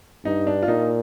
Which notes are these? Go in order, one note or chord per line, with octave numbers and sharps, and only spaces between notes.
G2 D#4
D4
F4
A#2 D#4